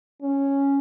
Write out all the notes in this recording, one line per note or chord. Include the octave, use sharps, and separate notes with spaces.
C#4